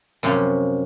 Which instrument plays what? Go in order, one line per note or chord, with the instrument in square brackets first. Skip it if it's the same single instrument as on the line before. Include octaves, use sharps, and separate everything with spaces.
[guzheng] F#2 C3 F3 C#4